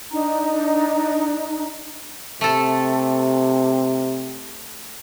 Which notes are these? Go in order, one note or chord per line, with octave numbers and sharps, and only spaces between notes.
D4 D#4 A#5
C3 A3 A4